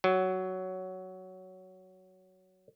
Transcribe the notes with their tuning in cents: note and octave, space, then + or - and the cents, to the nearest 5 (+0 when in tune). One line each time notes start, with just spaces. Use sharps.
F#3 +10